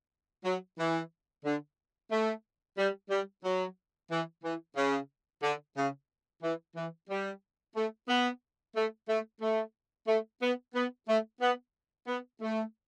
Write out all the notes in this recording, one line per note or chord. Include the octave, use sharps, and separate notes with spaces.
F#3
E3
D3
A3
G3
G3
F#3
E3
E3
C#3
D3
C#3
E3
E3
G3
A3
B3
A3
A3
A3
A3
B3
B3
A3
B3
B3
A3